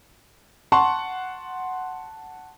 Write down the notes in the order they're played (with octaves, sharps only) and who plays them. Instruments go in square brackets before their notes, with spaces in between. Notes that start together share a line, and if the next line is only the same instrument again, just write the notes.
[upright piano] F#5 A5 C6 C#6